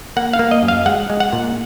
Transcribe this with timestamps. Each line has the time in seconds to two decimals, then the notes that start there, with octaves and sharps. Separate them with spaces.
0.17 A#3 F#5
0.33 F5
0.39 A#3
0.51 D#5
0.63 F#2
0.68 F5
0.86 G#3 F#5
1.10 G#3
1.20 F#5
1.33 A#2